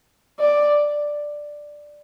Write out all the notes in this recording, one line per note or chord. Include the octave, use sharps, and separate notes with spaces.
D5